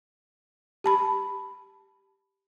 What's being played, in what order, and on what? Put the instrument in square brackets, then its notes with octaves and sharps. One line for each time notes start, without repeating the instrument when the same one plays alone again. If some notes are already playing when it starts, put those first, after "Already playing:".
[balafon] G4 A5 B5